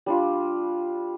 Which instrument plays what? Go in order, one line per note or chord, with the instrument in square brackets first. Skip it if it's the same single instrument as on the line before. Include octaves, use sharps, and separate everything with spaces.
[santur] G3 D4 F4